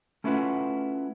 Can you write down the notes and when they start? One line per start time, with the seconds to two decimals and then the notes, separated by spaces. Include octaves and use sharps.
0.24 A3 C#4 E4 F4 B4 F#5